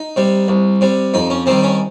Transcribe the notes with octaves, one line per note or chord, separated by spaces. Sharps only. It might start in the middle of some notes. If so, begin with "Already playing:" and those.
Already playing: D#4
C3 G3
C2
C3 G3
F2 D#4
C#4
C3 D#3 G3 C4
C#4